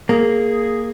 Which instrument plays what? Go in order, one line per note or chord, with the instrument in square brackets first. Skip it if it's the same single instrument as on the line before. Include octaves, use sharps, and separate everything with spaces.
[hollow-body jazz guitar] A#3 [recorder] G#4